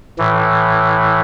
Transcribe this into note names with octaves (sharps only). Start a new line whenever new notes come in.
A2 E3